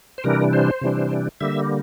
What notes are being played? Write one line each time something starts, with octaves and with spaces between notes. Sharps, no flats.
C5
C3 E3 G3 D4 A#4
C5
C3 E3 G3 D4
D3 G3 A#3 E5